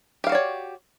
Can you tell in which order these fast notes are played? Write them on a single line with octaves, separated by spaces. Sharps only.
G4 F5 F#4 D5 C#5